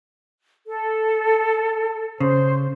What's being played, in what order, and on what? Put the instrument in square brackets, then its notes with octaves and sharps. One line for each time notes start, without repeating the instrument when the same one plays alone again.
[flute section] A4
[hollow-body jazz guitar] C#3 [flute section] C5